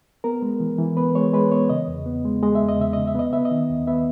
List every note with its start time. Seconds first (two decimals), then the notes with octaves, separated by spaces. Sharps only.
0.24 B3 A#4
0.42 G#3
0.60 E3
0.79 E3
0.97 B3 B4
1.15 G#3 C#5
1.33 G#3 B4
1.51 B3 C#5
1.69 C#3 D#5
1.88 E2
2.06 B3
2.25 G#3
2.43 G#3 D#5
2.55 E5
2.61 E2
2.69 D#5
2.79 C#3 E5
2.93 C#3 D#5
3.07 E5
3.15 B3 D#5
3.33 B3 E5
3.45 D#5
3.51 D#3
3.70 D#2
3.87 B3 E5